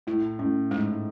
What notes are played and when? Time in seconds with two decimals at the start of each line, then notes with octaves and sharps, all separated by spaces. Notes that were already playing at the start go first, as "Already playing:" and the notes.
0.07 A2 E4
0.39 A2 C#4
0.71 G#2 G#3
0.87 A2